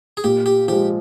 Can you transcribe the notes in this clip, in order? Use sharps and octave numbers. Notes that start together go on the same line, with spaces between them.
G#4
A#2 G4
G4
F3 G#3 G4